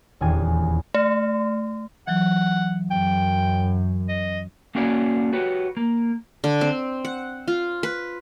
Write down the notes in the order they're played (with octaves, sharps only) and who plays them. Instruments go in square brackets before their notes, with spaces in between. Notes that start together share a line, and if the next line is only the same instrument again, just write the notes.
[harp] D#1 E2 G#5
[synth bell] A3
[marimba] E3 F#3 [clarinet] F#5
[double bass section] F#2 [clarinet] G5
[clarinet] D#5
[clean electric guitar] A#3 C#4 F#4 G#4 C#5 D5
F#4 G4 B4 C#5
A#3
[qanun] D3
C4
F#5
F4
B4